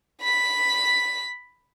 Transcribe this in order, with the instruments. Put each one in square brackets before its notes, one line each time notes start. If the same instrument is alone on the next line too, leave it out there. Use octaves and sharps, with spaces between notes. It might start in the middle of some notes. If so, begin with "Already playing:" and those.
[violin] B5 B6